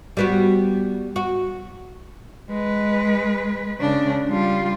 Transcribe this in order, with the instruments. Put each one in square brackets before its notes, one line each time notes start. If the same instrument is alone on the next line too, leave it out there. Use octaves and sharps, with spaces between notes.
[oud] G3 B3 F#4
F#4
[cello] G#3 B4
C#3 D4
G3 F4